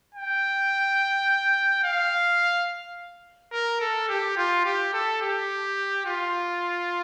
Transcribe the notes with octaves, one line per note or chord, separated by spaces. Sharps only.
G5
F5
A#4
A4
G4
F4
G4
A4
G4
F4